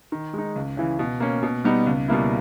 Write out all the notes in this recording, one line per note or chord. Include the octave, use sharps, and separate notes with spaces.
D#3
G#3 D#4
C#2
C#3 E3
B2
A#3 C#4
B2
G3 B3 D#4
C#2
B2 G3 A#3 E4